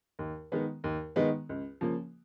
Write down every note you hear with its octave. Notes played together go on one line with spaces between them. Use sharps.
D#2
D#3 G#3 B3
D#2
D#3 G#3 B3
C#2
C#3 F3 A#3